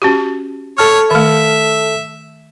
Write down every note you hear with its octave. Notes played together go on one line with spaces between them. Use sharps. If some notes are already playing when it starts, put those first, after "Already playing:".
C#4 F#4 G4
A4 C#5 A5 F6
D#3 A3 E5